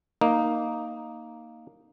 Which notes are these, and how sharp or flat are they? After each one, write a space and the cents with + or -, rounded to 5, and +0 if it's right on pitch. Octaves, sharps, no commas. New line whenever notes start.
A#3 +0 D#4 +0